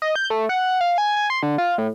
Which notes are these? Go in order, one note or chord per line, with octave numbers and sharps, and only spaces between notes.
D#5
G6
A3
F#5
F5
G#5
G#5
C6
D3
F4
A2